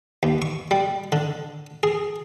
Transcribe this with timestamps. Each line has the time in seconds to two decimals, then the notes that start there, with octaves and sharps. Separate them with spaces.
0.23 D#2
0.42 C#6
0.71 G3
1.12 D3
1.83 G#4